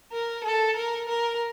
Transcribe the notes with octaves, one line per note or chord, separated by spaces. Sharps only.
A#4
A4
A#4
A#4